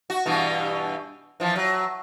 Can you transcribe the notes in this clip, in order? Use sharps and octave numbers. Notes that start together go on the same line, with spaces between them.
F#4
G2 B2 E3
E3 F3
F#3